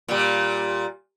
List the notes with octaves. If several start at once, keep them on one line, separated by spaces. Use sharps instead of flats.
A#2 G3